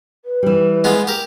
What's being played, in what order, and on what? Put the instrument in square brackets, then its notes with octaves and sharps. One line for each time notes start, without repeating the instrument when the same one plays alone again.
[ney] B4
[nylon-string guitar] E3 G3
[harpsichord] G#3 B3 F4
G4 A#4